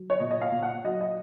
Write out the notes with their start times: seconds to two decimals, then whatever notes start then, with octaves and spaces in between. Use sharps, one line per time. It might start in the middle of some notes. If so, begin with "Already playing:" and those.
Already playing: F#3
0.10 C#5
0.20 A#2 D#5
0.31 D#5
0.41 F5
0.52 A#2
0.63 F#5
0.84 F#3 D#5
1.01 D#5